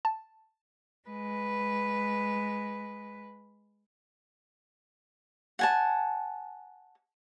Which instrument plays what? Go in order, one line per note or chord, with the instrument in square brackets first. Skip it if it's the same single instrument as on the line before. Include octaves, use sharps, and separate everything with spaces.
[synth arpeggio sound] A5
[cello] G#3 B4
[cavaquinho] F#5 G#5 A5